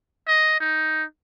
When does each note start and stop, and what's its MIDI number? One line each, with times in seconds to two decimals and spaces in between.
0.27 0.58 75
0.60 1.03 63